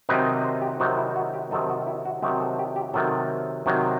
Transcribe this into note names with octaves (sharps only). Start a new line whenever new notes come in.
C3 D#3 F#3 C4 D#4 B4
D#5
C5
G4
C3 D#3 F#3 C4 D#4 F#4
E4
F#4
G4
C3 D#3 F#3 C4 D#4 A4
F#4
E4
F#4
C3 D#3 F#3 C4 D#4 G4
A4
G4
G4
C3 D#3 F#3 A4
C3 D#3 F#3